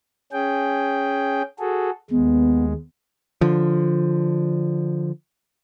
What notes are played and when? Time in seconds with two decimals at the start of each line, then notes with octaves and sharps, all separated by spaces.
0.32 C#4 G#4 G5
1.59 F#4 G#4 A4
2.11 D#2 G#3 B3
3.41 D3 F3